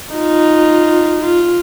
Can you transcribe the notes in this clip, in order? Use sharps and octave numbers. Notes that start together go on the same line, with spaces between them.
D#4 F4
F4